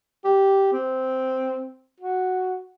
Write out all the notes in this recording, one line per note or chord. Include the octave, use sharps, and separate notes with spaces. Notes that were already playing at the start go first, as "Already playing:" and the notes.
G4
C4
F#4